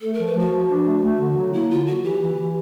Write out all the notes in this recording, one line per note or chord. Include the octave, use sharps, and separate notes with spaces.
A3 A4
A#4
F3
B4
F3 F#4
F3
D4
A3
A3
D3
F#3
A#3 E4
D3 F4
F#3 F#4
E3 G4
E3
E3